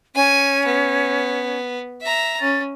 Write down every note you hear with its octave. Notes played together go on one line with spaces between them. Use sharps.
C#4 G#5
B3
E5 A#5
C#4 A6